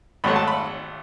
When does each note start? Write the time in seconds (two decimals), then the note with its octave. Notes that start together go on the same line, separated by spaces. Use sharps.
0.24 G#1 G#2 F#3 A3 B5
0.36 A5
0.47 B5